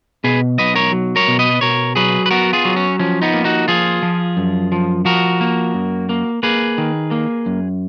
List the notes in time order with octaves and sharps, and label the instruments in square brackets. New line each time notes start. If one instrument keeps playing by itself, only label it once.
[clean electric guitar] B2 G#4 B4
B1 B4 D#5
A#4 C#5
F#3
A#4 C#5
B2
B4 D#5
B2 A#4 C#5
F#3 G#4 B4
B4
B3 F#4 A#4
F4 G#4
F#3
C#4
F3 C#4
B3 D#4
A#3
D#4 F#4
F3 F4 G#4
F3
F#2
F3
F3 F#4 A#4
A#3
F#2
A#3
A#3 G#4 B4
D#3
A#3
F#2